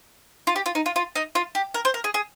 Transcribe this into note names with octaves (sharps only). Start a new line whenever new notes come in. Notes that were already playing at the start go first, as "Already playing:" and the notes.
F4
G4
F4
D#4
F4
F4
D#4
F4
G4
A#4
C5
A#4
G#4
G#4